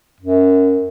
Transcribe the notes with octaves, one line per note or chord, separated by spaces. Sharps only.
F#2